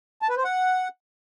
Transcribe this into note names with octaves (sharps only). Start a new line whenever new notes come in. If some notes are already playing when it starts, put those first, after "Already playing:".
A5
B4
C5
F#5